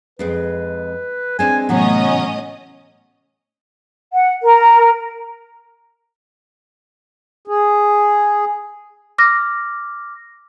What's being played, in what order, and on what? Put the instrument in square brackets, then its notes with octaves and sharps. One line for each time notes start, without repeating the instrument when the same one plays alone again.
[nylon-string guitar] F2 G#3 C4 [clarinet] B4
[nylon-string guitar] G#3 C4 D4 [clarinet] G#5
[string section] A2 C#4 D#5 [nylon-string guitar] C3 E3 F#3 [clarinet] B3
[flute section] F#5
A#4
[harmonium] G#4
[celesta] D6 F6 A#6